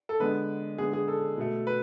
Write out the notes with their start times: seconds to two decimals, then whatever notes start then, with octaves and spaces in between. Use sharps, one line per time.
0.09 A4
0.20 D3 G#3 B3 B4
0.78 D3 G#3 B3 G#4
0.93 G#4
1.08 A4
1.37 B2 A3
1.67 B4